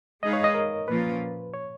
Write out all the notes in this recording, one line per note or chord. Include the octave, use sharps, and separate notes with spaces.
G#3 D#4 G#4 B4 D#5 F5
C#5
D#5
A#4
A#2 F3 A#3 C#4 F4 B4
C#5